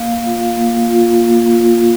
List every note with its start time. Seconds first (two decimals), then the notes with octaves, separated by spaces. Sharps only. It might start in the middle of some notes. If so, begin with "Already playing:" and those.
Already playing: A#3 F5
0.15 F5
0.26 F4
0.36 F5
0.57 A#3
0.89 F4
1.21 A#3
1.52 F4